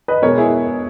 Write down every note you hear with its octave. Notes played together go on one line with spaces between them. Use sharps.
B4 D#5
B2 G#3 A#4 C#5
E4 G#4